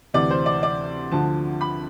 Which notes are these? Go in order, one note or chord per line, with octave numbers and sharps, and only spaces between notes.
D2 C3 E3 D5
C5
D5
D5
D2 D3 F3 A5
B5